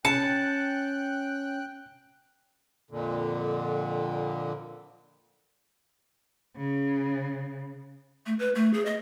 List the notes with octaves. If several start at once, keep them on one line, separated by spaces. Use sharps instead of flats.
C#4 G5 A5 F#6 C#7
F2 A#2 D3
C#3
A3
B4
A3
G#4
D#5